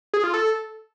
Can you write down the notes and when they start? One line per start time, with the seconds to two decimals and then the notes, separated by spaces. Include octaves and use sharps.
0.14 G#4
0.24 F4
0.34 A4